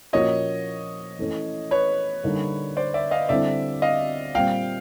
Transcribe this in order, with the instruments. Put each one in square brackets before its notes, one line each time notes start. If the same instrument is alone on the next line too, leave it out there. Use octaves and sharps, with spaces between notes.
[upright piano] A#2 F3 A#3 C#4 F#4 [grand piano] C#5 D#5
[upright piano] E3 A3 C#4
[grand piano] B4 C#5
[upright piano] D3 G3 A#3 D#4
[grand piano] C5 D5
D5 E5
D#5 F5
[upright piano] D3 G3 C4 E4 [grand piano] D5 E5
[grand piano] D#5 F5
[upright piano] A#2 G3 C4 [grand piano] F5 G5